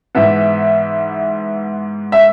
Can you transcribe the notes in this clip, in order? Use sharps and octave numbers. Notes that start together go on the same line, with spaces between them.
G#2 E3 B3 E5
E5